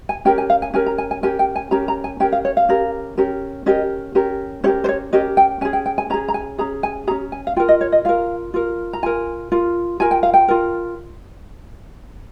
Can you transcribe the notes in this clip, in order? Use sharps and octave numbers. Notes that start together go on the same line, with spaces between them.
G#5
C#4 G4 A#4 G5
G#5
F5
G#5
C#4 G4 A#4 G#5
A#5
G#5
G#5
C#4 G4 A#4 G#5
G5
G#5
C#4 G4 A#4 A#5
A#5
G#5
C#4 G4 A#4 G5
F5
C#5
F5
C#4 G4 A#4
C#4 G4 A#4
C#4 G4 A#4 D#5
C#4 G4 A#4
C#4 G4 A#4 C#5
C5
C#5
C#4 G4 A#4 D#5
G5
C#4 G#4 G#5
G5
G5
G#5
C#4 G#4 A#5
A#5
G#5
C#4 G#4 A#5
G#5
G#4 A#5
C#4
G#5
F5
F4 A#4 G5
D#5
C#5
D#5
F4 A#4 F5
F4 A#4
A#5
F4 A#4 G#5
F4 A#4
F4 A#4 G#5
G5
F5
G5
F4 A#4